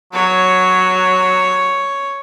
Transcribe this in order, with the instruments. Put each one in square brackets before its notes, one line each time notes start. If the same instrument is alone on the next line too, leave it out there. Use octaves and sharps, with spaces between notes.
[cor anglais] F#3 [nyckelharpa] C#5